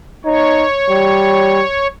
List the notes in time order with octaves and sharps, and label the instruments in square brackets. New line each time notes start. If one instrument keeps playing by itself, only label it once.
[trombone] D#4 [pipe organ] C#5
[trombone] G3